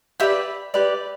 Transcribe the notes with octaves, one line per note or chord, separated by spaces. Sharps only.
G4 B4 D5 E5 G5
G4 B4 D5